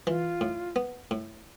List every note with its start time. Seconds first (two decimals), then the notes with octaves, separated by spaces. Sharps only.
0.07 E3 F4
0.41 A2
0.76 B3
1.11 A2